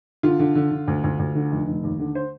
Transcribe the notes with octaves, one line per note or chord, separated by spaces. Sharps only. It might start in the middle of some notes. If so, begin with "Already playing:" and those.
D3 F4
D3
D3
D3
D2
D2
D2
D3
F1
F1
D#2
D3
C5